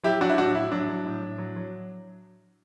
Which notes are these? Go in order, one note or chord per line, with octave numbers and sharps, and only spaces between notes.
F#3 E4 G4
F#3 D4 F#4
E4
A2 D4 F#4
A2 E4
F#3 D4
F#3
A2
A2
F#3
F#3